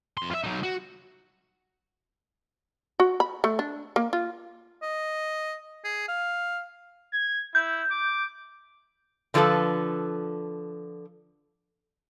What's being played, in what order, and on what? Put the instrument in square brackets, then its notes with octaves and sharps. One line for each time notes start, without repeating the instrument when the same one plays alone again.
[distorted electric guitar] F2 C6
F4 E5
F#3 D#4
F#4
[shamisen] F#4
B5
A3
D4
A#3
F4
[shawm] D#5
G#4
F5
[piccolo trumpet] G#6
[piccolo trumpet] E4 [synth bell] G6
[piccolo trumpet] D6
[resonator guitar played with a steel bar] D3 F3 F#3 E4 A4 B4